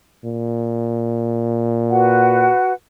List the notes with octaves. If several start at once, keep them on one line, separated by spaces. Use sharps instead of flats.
A#2
F#4 B4 F#5